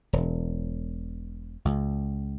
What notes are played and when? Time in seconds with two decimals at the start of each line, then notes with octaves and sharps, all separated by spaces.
0.13 E1
1.65 C#2